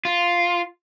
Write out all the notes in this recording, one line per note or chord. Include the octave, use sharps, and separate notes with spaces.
F4